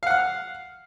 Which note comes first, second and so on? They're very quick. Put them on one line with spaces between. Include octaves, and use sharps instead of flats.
F5 F#5 F6